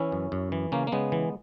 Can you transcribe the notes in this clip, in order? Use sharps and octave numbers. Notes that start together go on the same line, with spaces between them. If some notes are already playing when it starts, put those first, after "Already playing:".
Already playing: E3 C#4 E4
F#2
F#2
E3
C#3 A#3 C#4
A#3
C#3 G#3 B3
E3